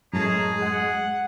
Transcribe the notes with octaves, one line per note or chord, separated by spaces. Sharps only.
F#2 A2 G#3 C#4 G#4 A5 A#5
F#5